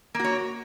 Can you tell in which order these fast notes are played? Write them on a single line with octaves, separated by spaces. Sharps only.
A#3 F#4 C#5